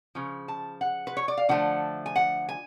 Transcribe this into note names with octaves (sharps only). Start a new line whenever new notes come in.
C#3 F3
A5
F#5
B4
C#5
D5
F5
D3 F3 A3 F#5
G#5
F#5
G#5